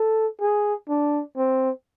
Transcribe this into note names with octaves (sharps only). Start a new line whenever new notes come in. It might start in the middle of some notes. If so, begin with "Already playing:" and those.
Already playing: A4
G#4
D4
C4